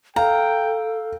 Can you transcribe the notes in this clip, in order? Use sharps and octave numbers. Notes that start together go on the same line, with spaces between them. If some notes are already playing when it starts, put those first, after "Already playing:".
A4 F5 G5 A#5